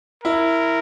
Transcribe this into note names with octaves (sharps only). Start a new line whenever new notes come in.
E4 A#4